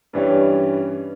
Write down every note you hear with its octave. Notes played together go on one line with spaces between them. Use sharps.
G2 E3 G3 C#4